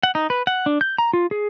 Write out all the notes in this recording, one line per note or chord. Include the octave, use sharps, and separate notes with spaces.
F#5
D#4
B4
F#5
D4
G6
A#5
F4
G#4